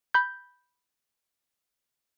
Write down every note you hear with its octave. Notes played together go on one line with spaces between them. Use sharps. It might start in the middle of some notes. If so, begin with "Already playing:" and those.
B5 G6